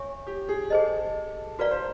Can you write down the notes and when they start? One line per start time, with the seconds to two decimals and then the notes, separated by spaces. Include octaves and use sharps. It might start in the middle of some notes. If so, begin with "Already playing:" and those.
Already playing: C#5 E5 G#5 C#6
0.27 G4
0.49 G#4
0.70 G#4 A4 C5 D#5
1.59 F#4 A#4 B4 D5 F5
1.71 C5